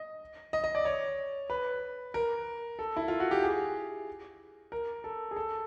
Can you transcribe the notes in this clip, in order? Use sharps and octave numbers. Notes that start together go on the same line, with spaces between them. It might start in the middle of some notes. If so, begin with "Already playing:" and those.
Already playing: D#5
D#5
D#5
D5
C#5
B4
A#4
A4
E4
F4
F#4
G4
G#4
A#4
A4
G#4
A4